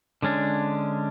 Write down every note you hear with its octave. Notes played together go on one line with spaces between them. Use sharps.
D3 G#3 C#4 D4